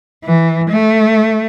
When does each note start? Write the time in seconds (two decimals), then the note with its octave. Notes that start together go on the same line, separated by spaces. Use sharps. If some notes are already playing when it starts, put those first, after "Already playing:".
0.24 E3
0.70 A3